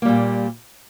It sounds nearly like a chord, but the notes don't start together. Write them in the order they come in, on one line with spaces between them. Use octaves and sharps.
A#3 G3 A#2